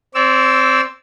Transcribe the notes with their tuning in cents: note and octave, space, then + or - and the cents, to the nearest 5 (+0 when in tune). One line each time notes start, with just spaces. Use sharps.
C4 +0 D5 -35 E6 +0